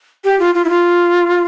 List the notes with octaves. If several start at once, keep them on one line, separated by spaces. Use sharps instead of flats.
G4
F4
F4
E4
F4